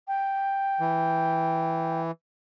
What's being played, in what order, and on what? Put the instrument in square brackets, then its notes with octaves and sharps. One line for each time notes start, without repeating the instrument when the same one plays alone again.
[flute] G5
[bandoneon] E3